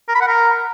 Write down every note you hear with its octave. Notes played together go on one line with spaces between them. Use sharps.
A#4
B5
F#5
A#4